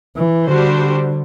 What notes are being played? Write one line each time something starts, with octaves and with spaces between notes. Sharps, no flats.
E3
D3 G3 D4 F#4 C5